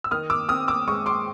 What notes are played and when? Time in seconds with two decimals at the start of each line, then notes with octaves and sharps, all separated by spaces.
0.04 E6
0.11 D#3 D#6 F6
0.30 D6 E6
0.49 C4 D#6 F6
0.68 D6 E6
0.88 G#3 C#6 D#6
1.06 C6 D6